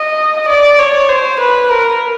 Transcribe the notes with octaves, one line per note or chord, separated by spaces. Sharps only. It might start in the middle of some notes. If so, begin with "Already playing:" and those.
Already playing: D#5
D5
C#5
C5
B4
A#4